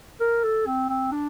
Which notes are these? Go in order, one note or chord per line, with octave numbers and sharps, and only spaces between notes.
A#4
A4
C4
C4
D4